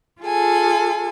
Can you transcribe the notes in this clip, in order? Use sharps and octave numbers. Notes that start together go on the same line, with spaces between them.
F4 G#4 A4 G#5